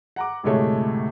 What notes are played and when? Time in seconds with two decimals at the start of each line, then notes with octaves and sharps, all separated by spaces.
0.16 F#5 A#5 D6
0.43 D2 A2 C3 G#3 A3 C#5